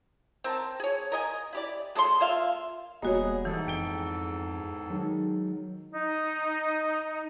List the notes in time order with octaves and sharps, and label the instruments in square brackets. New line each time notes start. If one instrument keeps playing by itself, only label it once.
[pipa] C4 A#4 G5 A5
G#4 C#5
A#4 D#5 G#5
E4 G4 D5
G#3 A4 D5 C6
A#3 F4 E5 F5
[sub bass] E1 [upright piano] G3 B3 D#5 [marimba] A#3 F#4 C#5 [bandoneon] G#4
[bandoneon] E2 G#2 A4 [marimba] E3
[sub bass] F2 [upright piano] G5 D7 G7
[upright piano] D#3 G#3 [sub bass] F#3
[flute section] D#4